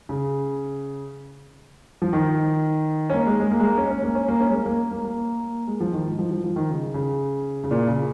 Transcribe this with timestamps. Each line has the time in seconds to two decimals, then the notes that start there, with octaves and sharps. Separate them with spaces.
0.09 C#3
2.02 F3
2.13 D#3
3.10 C#4
3.14 A#3
3.27 G#3
3.40 G#3
3.51 A#3
3.60 G#3
3.64 A#3
3.77 C#4
3.90 C#4
4.03 A#3
4.15 C#4
4.28 A#3
4.41 C#4
4.49 G#3
4.54 A#3
4.66 A#3
4.91 A#3
5.04 A#3
5.67 G#3
5.81 F3
5.93 D#3
6.06 G#2
6.19 F3
6.31 F3
6.44 F3
6.56 D#3
6.69 C#3
6.94 C#3
7.64 C#3
7.71 A#2
7.88 C#3